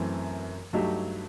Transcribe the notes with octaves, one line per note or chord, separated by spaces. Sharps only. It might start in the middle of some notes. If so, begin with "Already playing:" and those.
Already playing: F#2 E3 A3 C4
G2 F#3 A3 D#4 G4